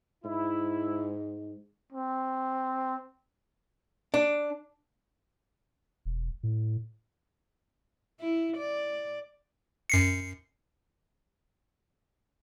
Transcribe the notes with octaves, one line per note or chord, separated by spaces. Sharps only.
G#2 E4
C4
D4
E1
A2
E4
D5
F#2 C7 C#7